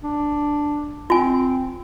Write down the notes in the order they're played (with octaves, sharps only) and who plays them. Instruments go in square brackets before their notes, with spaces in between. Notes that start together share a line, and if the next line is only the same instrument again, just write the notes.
[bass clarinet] D4
[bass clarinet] C4 [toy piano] F4 G#5